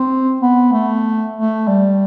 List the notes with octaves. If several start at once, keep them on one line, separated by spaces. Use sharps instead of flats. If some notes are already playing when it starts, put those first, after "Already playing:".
Already playing: C4
B3
A3
A3
G3